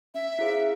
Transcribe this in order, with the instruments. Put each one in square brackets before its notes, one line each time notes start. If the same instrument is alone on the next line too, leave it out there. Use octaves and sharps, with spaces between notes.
[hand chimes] C#4 [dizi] E5
[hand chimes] E4 G#4 C5 F5